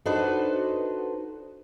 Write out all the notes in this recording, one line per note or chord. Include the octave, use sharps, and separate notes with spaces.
D4 D#4 F#4 A4 B4 C5